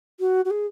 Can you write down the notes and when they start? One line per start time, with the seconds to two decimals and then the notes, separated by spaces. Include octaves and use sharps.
0.19 F#4
0.45 F#4
0.50 G#4